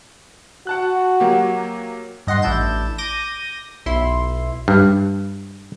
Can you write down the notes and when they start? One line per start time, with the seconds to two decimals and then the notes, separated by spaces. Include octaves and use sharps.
0.67 F#4 F#5 A5 F#6
1.20 F#3 A#3 G4
2.27 G2 D#5 F#5 C6
2.42 A1 D4 E4 A5 G6 E7
2.98 D6 G6 A#6 D#7
3.86 B1 E4 C6
4.68 G2